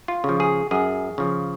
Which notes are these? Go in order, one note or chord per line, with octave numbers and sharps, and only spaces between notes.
F4
C#3 F3
G#4
F#2 G#4
C#3 F3